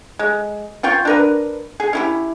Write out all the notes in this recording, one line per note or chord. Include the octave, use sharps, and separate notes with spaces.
G#3
C#4 F4 G5 C#6
D4 A#4 B4
G#4
C#4 E4 G4